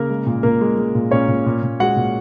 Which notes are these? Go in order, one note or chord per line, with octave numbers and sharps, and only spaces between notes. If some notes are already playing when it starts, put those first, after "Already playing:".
Already playing: C#3 A#3 A#4
G#3
A#2
A#2 A#3 A#4
G#3
G#3
A#2
A#2 C#4 C#5
A#2
A#2
A#2
G#3 F#4 F#5
A#2